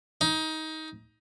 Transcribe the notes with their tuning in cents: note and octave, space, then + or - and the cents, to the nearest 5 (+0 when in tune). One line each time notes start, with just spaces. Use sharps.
D#4 +20